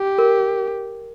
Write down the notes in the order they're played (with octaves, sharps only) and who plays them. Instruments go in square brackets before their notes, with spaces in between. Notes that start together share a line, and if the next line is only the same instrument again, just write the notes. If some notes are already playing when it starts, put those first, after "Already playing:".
Already playing: [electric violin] G4
[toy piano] A#4